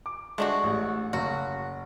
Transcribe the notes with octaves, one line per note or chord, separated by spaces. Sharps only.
D6
G#3 A3 D4 F#4
A1
F#1 F#4